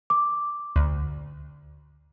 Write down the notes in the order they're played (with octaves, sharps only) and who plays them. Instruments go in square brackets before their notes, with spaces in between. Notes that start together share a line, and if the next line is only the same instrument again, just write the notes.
[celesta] D6
[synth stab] D2